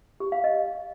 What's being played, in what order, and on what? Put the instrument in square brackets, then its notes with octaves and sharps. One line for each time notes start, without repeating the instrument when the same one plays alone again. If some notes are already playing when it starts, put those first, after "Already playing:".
[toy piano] G4
F5
D#5